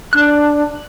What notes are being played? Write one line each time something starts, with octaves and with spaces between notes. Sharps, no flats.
D4 F#6